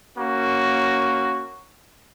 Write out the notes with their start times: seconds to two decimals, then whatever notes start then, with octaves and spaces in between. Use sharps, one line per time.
0.16 A#3 C#4 F#4